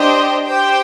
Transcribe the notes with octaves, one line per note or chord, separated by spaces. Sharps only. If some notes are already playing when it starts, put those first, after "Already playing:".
Already playing: D4 G4 C5 D#5 G5
G4 C5 G5